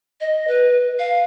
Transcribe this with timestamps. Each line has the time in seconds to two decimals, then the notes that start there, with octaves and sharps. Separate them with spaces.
0.21 D#5
0.47 B4
0.99 F5